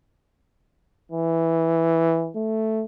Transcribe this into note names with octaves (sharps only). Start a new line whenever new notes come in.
E3
A3